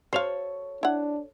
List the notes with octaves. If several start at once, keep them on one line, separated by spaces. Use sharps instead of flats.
F#4 A4 C5 C#5 F5
D4 E4 F#5